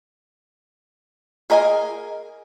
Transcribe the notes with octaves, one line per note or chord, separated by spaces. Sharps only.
G#4 A#4 D#5 F5 G#5